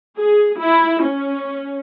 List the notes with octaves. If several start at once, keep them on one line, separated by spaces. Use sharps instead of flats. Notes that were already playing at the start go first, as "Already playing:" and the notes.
G#4
E4
C#4